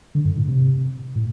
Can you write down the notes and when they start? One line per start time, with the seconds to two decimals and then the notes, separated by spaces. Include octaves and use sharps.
0.15 D3
0.25 G2
0.36 A2
0.48 C3
1.16 A2